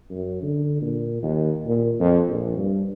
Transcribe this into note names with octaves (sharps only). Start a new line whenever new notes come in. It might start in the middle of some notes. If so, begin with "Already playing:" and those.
F#2
D3
A#2
D#2
A#2
F2
A#1
G2